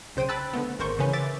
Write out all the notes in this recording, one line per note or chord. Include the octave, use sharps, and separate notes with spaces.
B1 C#3 C5 G5 D#7
A5 B5 E6 F#6 A6
D3 A3 B3
G#1 G#3 A#4 C5 C#6 G6
C#3 E3 C#4 B4
E5 D6 A6